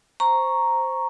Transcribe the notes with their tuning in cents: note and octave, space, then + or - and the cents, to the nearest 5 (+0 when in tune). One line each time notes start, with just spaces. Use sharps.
C5 +0 A#5 +0 C#6 +0